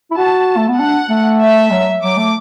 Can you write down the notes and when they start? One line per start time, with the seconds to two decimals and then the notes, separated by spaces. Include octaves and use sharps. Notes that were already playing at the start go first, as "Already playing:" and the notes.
0.11 E4
0.17 F#4 A5
0.57 A3
0.68 B3
0.79 D4 F#5
1.10 A3
1.41 E5
1.71 F#3
2.02 F#3 D6
2.17 A3